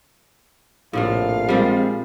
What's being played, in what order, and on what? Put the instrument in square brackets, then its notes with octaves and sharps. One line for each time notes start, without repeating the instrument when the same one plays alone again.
[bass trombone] A#1 [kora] A2 C3 A3 [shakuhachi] F5
[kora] A#2 F3 G3 [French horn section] G#3 C4